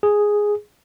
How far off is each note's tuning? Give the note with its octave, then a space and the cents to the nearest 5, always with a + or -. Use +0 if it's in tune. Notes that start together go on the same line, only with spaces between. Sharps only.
G#4 +0